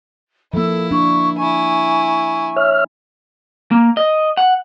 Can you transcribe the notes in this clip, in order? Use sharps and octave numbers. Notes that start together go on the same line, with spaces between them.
F3 A#3 E4 A4
D4 C#6
E4 G#5 C#6
C#5 E5 F6
A#3
D#5
F#5